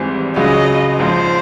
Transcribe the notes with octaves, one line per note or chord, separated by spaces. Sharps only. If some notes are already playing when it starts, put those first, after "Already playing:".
Already playing: G#1 G#2 E3 G3 C4
C#2 C#3 F#3 D#5
A#1 G#2 F3 C5